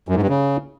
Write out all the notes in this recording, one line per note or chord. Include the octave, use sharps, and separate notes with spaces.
F#2
G#2
G2
C#3